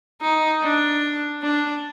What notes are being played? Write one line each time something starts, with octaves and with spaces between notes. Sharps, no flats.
D#4
D4
D4